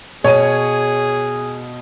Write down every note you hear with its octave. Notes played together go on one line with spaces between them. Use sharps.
B2 G#4 C#5 D#7